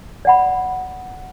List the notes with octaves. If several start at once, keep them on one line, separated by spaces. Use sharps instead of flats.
D5 F#5 B5